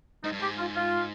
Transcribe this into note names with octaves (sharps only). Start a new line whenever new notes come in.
G#2 D#4
G2
G#2 G4
F4
F4